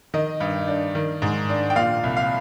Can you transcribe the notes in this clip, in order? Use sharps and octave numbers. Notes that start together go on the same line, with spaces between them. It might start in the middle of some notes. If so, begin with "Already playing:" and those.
D#3 D#5
G2
D4
D#3
G#2
D4
G5
A#2 F5
C2
F5